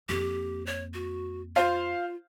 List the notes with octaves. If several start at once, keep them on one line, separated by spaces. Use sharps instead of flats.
F2 A#3 G4
C#5
F#4
F4 C5 F5